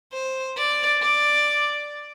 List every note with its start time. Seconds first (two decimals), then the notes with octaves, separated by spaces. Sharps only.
0.13 C5
0.57 D5
1.02 D5